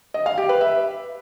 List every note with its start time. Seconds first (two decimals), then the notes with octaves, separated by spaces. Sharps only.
0.14 D#5
0.26 F5
0.38 G4
0.49 B4
0.61 E5